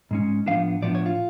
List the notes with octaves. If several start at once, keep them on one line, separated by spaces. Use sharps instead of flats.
G#2 G#3 C#4
A2 F3 B3 D4 F5
A2 F3 B3 D4 D5
C#5
F4